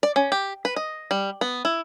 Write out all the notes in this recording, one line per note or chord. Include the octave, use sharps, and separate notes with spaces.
D5
C#4
G4
B4
D#5
G3
B3
E4